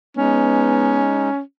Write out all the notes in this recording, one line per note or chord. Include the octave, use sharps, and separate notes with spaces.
G#3 B3 C#4 D#4